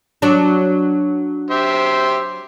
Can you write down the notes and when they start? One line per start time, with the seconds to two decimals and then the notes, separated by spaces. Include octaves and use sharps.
0.22 F#3 D4
1.51 G4 C5 E5